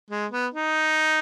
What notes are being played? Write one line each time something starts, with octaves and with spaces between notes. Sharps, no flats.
G#3
B3
D#4